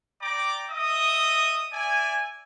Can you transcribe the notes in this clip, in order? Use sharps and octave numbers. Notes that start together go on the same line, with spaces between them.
D5 G5 A#5 D6
D#5 E5 D#6
D5 E5 G#5